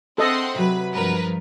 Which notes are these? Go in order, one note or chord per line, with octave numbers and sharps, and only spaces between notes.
C4 A4 D#5 F#5 C6
C3 F#3 B4 B5
G2 F3 A#4 B4